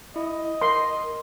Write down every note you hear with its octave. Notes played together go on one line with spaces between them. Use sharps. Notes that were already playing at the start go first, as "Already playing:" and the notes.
E4 D#5
A#4 C6